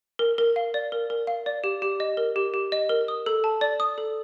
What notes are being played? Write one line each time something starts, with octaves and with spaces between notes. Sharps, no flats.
A#4
A#4
F5
D5
A#4
A#4
F5
D5
G4
G4
D#5
A#4
G4
G4
D#5
A#4
D#6
A4
A5
D5
D#6
A4